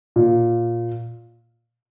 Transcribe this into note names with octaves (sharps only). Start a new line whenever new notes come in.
A#2